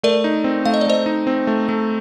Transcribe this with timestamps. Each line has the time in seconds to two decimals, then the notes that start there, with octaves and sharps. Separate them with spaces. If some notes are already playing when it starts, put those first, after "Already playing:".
0.03 A3 A#4 D5
0.24 D#4
0.44 C4
0.65 A3 F5
0.74 D#5
0.81 D5
0.87 A3 C5 D#5
1.06 D#4
1.27 C4
1.47 A3
1.69 A3